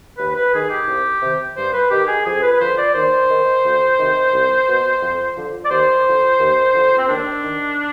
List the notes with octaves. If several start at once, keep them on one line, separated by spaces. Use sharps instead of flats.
D#2 B4
B4
D#3 G#4
G4
C2
C3 D#3
G2 C5
B4
D#3 G4
G#4
F2 G#4
B4
B4
D3 F3 C5
D5
D#2 C5
D#3
D2
C3 D#3
C2
B2
F2
D3 F3
D5
D#2 C5
D3 F3
D#2
D3 F3
C4
D#2 D4
D#3